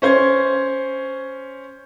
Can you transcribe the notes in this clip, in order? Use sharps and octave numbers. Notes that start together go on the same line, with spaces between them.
C#4 C5 G#6